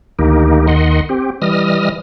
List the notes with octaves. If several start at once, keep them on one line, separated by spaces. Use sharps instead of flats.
D2 D#3 A#3 D#4 G4
D#2 D#3 D#5 F#5 C6
C4 G4
E3 G3 D#5 D#6 F6